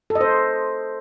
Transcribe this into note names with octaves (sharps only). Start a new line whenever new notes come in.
A4
D#5
C5